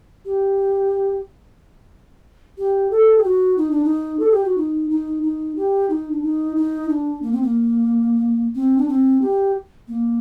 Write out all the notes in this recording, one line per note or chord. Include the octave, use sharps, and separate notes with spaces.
G4
G4
A4
G4
F#4
D#4
D4
D#4
A4
G4
F#4
D#4
D#4
D#4
G4
D#4
D4
D#4
D#4
D4
A#3
C4
A#3
C4
D4
C4
G4
A#3